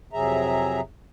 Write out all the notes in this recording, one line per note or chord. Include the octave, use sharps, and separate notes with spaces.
F2 C3 F#3 G#4 E5 A#5